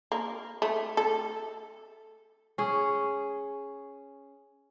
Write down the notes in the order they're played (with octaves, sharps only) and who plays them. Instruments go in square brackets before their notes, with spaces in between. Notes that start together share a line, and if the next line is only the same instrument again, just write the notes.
[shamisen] A#3
A3
A4
[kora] C#4 G#4